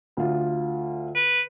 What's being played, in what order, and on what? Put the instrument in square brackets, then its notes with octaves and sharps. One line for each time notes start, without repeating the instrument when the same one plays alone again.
[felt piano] D2 F4
[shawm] B4